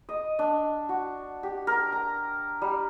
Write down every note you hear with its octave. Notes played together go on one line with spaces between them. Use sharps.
D#5
D4
F#4
G4
A#4
A#5
G3